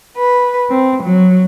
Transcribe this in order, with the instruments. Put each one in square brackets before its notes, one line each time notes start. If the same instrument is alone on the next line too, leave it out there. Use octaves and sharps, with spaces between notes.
[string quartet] B4
C4
F#3